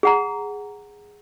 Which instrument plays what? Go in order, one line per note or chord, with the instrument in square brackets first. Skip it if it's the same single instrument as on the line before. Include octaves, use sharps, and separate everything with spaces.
[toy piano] G#4 F#5 A#5